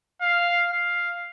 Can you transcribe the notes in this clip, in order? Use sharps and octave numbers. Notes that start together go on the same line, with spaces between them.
F5
F5